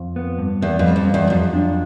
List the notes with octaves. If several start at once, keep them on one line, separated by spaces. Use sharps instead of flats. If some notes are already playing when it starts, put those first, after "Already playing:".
Already playing: F2
B3
G2
E2 B3
F2
G3
F2
G2
E2
F2 F#3
D4